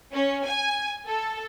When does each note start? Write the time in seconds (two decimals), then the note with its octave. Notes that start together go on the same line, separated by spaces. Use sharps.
0.14 C#4
0.46 G#5
1.07 A4